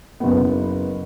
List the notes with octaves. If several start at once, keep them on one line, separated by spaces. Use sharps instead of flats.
F#1 B3